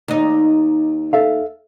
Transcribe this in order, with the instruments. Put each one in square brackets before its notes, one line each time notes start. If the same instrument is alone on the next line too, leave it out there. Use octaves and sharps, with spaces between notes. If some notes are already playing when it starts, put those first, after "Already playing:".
[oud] D#2 D#4
[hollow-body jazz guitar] A4 E5 F5